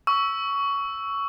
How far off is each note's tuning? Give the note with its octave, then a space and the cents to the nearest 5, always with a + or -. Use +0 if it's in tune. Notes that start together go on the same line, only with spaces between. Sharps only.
C#6 +15 E6 +0